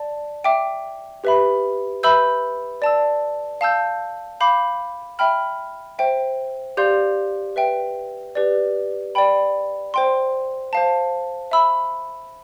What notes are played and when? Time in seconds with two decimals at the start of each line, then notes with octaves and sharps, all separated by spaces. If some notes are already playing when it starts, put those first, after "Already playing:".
Already playing: D5 A5
0.44 E5 G5 D6
1.24 G4 B4 E5 B5
2.03 B4 E5 B5 E6 G6
2.82 D5 A5 E6
3.61 F5 A5 E6 G6
4.40 F5 B5 D6 G6
5.19 E5 G5 B5 F6
5.99 C5 E5 G5
6.77 G4 D5 F5 C6 G6
7.56 B4 E5 G5
8.35 G4 B4 D5
9.15 D5 G5 B5
9.94 C5 G5 C6
10.73 C5 F5 A5
11.51 E5 B5 E6